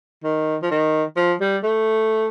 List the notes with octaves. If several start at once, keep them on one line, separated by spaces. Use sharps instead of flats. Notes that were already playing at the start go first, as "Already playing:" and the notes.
D#3
F3
D#3
F3
G3
A3